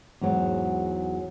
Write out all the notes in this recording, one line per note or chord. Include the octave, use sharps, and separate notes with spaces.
E2 G#2 F#3